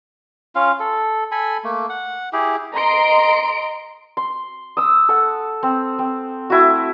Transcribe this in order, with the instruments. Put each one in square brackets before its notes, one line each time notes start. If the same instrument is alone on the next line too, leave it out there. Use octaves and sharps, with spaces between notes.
[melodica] C#4 F4 F5
A4
A4 G#5 B5
A3 A#3
F#5
E4 G4 G#4
[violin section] D#5 A#5 C6 D7
[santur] C6
D#6 E6
A4 F#5
C4
C4
A3 E4 F#4